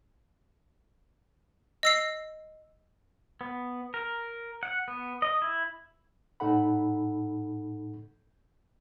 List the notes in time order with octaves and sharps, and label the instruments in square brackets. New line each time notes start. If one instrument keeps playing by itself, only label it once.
[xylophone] D#5 E6 C7
[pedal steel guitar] B3
A#4
F#5
B3
D#5
E4
[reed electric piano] A2 D#4 A4 F#5 B5